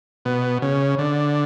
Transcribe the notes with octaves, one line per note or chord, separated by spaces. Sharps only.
B2
C#3
D3